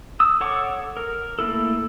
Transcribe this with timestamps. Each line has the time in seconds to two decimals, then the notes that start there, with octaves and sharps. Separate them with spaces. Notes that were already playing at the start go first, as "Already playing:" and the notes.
0.20 D#6 E6
0.41 A4 C#5 F#5 C#6 D6
0.97 A#4
1.39 A3 A#3 E4 A4